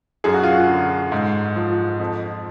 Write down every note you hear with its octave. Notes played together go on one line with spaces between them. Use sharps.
F#2 G#4
F#4
F4
F#4
D3
G#2
F3
F2